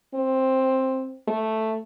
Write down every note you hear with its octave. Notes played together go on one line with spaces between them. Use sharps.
C4
A3